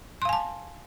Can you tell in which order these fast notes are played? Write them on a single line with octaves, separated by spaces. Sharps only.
C6 F5 G#5 A5